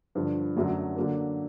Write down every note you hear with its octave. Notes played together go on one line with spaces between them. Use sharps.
G2 D3 F3
F#2 D3 F#3 A3
D3 F#3 A#3